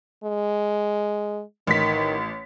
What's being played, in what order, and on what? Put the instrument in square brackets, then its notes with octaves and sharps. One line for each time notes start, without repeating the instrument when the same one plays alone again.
[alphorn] G#3
[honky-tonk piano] A1 B6 [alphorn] D#3